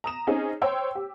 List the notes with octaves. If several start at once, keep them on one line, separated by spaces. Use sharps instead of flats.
A#5 D#6 E7
C4 C#4 D#4 G#4
C5 C#5 G5 E6
G4